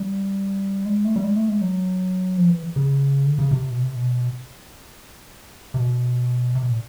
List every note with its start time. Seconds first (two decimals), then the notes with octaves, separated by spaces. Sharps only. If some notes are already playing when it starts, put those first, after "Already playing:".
Already playing: G3
0.85 G#3
1.05 A3
1.16 G3
1.23 G#3
1.36 A3
1.49 G#3
1.61 F#3
2.38 F3
2.50 E3
2.76 C#3
3.26 D3
3.39 C#3
3.51 C3
3.71 B2
3.83 C3
3.95 B2
5.74 C3
5.78 B2
6.55 C3
6.63 B2
6.70 A#2